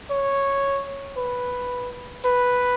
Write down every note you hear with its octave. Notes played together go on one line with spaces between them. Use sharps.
C#5
B4
B4